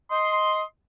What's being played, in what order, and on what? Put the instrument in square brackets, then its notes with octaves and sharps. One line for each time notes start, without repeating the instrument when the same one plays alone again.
[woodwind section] D#5 C6